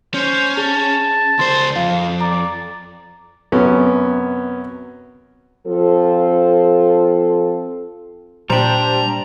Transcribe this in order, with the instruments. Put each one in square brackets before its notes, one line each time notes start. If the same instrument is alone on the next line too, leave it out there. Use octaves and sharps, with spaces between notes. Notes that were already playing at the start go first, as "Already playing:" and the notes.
[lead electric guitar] C#4 [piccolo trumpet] C5
[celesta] G#4 [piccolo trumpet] A5
[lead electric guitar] C#2 C5 [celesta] C6
[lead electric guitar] F2 [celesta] F5
[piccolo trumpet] D5 [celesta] A#5
[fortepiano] F#2 C3 C#4 [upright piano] B3
[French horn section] F3 C4 F4 A4
[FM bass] A#2 [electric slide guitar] G3 D4 [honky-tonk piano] G4 C5 [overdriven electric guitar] A#5